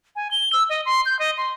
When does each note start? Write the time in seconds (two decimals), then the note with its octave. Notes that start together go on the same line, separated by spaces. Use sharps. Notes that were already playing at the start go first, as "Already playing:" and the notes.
0.16 G#5
0.31 G7
0.53 E6
0.70 D#5
0.86 C6
1.06 G6
1.19 D#5
1.38 C6